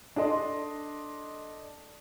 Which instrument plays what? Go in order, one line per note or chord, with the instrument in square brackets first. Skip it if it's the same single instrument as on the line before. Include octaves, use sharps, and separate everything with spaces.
[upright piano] D4 A4 D#5 C6